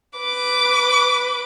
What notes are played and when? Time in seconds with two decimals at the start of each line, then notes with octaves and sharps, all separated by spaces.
0.19 B4 D6